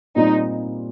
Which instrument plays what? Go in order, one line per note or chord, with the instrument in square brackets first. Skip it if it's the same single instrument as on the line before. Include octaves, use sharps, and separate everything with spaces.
[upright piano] A#2 G3 C4 F4 [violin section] D#4